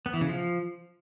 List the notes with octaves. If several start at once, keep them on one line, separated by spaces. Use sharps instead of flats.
B3
E3
C#3
F3